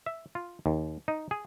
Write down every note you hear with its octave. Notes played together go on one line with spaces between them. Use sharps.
E5
F4
D#2
D#4
G#4